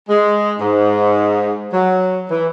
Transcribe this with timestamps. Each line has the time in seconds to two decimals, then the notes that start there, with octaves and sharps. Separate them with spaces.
0.08 G#3
0.59 G#2
1.72 F#3
2.29 E3